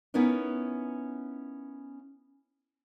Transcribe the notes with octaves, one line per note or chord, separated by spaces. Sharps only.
B3 C#4 D#4 E4 A#4 B4